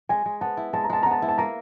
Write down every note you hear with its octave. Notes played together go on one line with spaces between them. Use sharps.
G#3 G#5
G#3
B3 A5
E4
G#3 A5
A#5
G#3 A5
B3 A#5
A5
E4
A5
A#3 A#5